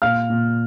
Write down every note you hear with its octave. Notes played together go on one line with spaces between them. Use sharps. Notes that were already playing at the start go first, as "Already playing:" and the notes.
A#2 F5 F6
A#2